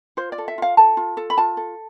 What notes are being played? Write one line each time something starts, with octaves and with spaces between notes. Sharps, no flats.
F4 C5
D5
A4
E5
F4 F5
A4 A5
F4
A4
B5
F4 A5
A4